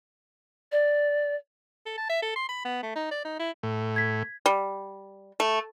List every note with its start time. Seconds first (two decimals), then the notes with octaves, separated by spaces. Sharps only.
0.72 D5
1.86 A4
1.98 A5
2.09 E5
2.22 A4
2.36 C6
2.49 B5
2.65 B3
2.83 A3
2.96 D#4
3.11 D5
3.25 D#4
3.39 E4
3.63 A2
3.96 G#6 B6
4.46 G3
5.40 A3